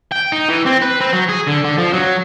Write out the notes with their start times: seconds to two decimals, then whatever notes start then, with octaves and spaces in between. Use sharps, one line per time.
0.12 G5
0.32 D#4
0.49 E3
0.66 C4
0.82 B4
1.00 C4
1.13 F#3
1.29 G#4
1.47 D3
1.64 D3
1.78 F3
1.93 F#3